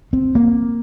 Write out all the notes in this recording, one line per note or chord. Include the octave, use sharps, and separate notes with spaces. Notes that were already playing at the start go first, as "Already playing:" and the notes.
C4
A#3